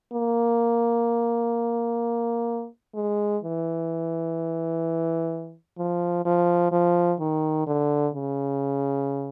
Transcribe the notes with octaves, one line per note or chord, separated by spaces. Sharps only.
A#3
G#3
E3
F3
F3
F3
D#3
D3
C#3